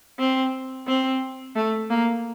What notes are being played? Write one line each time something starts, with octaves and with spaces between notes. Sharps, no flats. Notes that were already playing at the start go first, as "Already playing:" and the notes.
C4
C4
A3
A#3